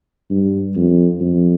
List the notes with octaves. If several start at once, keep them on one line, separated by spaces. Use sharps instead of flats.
G2
F2
F2